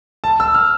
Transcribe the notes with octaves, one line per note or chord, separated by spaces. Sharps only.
A5
E6
F6